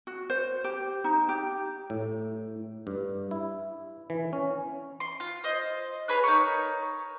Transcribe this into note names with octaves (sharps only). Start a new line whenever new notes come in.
F#4
C5
G4
D#4
G4
A2
G2
E4
E3
C#4
C6
F4
C5 D#5
G#4 B4 C#5 F#6
D#4 A#4 C#5 C#6